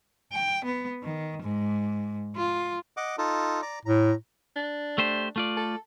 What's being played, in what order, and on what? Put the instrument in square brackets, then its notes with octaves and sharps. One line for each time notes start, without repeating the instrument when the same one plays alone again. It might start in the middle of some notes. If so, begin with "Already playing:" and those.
[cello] G5
B3
D#3
G#2
F4
[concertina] D#5 F#5 D6
D#4 F4 A4
D5 A#5
[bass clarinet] A2 [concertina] A#5
[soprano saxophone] D4
[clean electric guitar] A3 G4 C5
A3 F4 D5
[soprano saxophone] A4